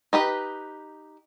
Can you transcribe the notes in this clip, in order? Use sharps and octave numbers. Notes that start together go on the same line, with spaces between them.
D#4 G4 B4